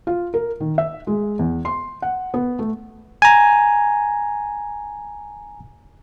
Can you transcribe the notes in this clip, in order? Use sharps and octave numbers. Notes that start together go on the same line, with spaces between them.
F4
A#4
D#3
E5
G#3
E2
C6
F#5
B3
A3
G#5 A#5